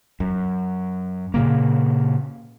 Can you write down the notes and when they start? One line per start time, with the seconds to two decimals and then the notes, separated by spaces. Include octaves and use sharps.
0.20 F#2
1.34 A#2 C#3 A#3